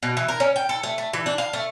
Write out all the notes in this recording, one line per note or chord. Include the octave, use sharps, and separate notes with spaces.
B2
E3
A#4
C#4
G5
A4
A3
A3
E3
D4
F5
A3